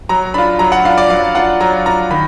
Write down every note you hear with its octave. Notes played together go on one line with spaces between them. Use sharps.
F#3 A#5
D4 F4 B5
F#3 A#5
F#5
D4 F4 F5
D5
F#3 F5
D4 F4 F#5
F#3 A#5
D4 F4 A#5
D#3 B5